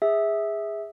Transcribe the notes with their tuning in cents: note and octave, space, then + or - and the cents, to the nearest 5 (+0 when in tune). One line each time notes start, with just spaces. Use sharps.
G#4 -20 E5 -15